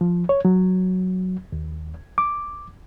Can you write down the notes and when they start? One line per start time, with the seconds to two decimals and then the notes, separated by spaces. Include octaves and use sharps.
0.01 F3
0.29 C#5
0.45 F#3
1.52 D#2
2.18 D6